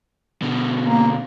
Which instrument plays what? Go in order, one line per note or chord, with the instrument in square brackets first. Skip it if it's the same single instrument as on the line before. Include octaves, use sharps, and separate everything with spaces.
[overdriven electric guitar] B2 D3
[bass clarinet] A#3